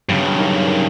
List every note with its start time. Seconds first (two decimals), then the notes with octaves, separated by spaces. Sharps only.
0.09 G2 C#3 F#3 B3
0.37 C#4 D#4 A#4